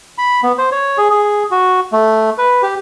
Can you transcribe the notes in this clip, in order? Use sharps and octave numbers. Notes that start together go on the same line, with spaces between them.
B5
B3
C5
C#5
G#4
G#4
F#4
A3
B4
G4